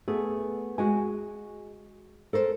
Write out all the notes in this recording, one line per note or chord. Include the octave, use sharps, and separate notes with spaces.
A3 B3 G#4
G#3 F#4 G#5
A4 A#4 C5